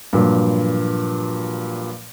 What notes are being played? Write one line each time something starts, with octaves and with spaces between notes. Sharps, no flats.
G2 A#2 F3 F#3